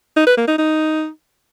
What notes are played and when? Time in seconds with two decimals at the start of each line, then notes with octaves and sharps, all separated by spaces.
0.16 D#4
0.27 B4
0.37 A#3
0.48 D#4
0.58 D#4